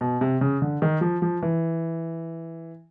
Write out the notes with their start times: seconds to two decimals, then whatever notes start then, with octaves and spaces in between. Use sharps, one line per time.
0.01 B2
0.21 C3
0.41 C#3
0.62 D3
0.82 D#3
1.01 F3
1.22 F3
1.42 E3